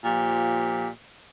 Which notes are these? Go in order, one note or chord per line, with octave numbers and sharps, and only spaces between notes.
A#2 F3 G4